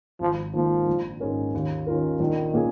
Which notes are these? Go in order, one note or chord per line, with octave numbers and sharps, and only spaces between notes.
G#1 F3
G#2 D#3 F3 A#3
A#1
G#2 G#3 C#4 A#4
D#2
D#3 C#4 F4 A#4
A#1 D#3
A#2 A#3 C#4 G#4